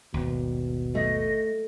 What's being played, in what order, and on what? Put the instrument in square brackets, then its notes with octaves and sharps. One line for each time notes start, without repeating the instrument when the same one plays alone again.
[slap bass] G#1 D#2 [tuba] B2
[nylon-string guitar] A3 [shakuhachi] D#5